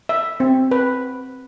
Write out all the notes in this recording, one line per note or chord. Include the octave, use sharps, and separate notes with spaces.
E5
C4
B4